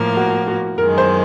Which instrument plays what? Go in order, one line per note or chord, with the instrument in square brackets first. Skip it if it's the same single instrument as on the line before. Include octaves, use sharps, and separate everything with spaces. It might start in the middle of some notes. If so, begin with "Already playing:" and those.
Already playing: [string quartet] A2 F3 A#3
[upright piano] F#4
F#4
[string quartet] F#2 D#3 G#3 [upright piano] A#4
[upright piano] C5